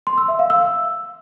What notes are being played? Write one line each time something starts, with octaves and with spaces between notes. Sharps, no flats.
C6
E6
E5
F5
E6